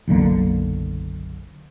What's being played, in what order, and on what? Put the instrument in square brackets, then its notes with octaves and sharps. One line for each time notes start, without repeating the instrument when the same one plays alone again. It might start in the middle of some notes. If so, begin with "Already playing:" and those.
[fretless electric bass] F#1 B1 D3 A#3